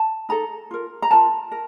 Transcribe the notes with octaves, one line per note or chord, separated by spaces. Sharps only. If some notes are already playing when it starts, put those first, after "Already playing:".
Already playing: A5
D#4 A4 A#5
F4 A#4
A#5
F4 A#4 A5
A#4